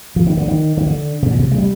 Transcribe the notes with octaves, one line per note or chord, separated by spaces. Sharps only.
F3
D#3
D3
D#3
D#3
D3
C3
A#2
C3
G#3
G3